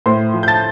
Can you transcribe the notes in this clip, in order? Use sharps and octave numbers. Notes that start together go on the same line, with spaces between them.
A2 C5 C6
F3
G6
A5 A6